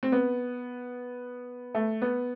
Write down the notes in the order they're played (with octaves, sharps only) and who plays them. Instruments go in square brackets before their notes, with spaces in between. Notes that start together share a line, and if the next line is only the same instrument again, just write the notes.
[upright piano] C4
B3
A3
B3